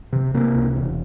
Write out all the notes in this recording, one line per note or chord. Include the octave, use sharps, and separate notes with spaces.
C3
C3 A#3
C#2
E1